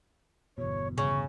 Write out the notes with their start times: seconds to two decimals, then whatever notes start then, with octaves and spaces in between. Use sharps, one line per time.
0.58 G1 E2 B2 C#5
0.98 C#3 C#6